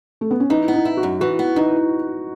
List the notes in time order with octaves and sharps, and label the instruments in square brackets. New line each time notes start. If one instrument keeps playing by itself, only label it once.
[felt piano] A3
B3
C#4
[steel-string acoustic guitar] E3 [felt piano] D#4
[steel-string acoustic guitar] B3
[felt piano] D#4
[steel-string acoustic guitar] E4
[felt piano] F#4
[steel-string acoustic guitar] F#2
[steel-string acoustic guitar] E3 [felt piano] F#4
[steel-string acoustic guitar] B3
[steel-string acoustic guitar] E3 [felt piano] D#4